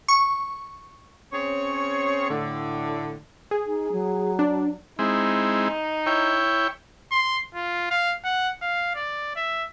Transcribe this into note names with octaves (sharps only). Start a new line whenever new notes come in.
C#6
C4 C#4 G#4 C#5
A2 D3
G#4
D#4
F#3
D4
G#3 C4 D#4 E4
E4 C#5 G5
C6
F4
F5
F#5
F5
D5
E5